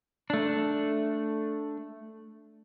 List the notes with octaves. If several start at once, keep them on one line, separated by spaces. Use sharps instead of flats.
A3 D4